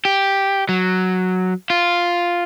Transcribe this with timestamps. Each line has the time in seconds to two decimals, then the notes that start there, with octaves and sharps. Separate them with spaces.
0.05 G4
0.69 F#3
1.70 F4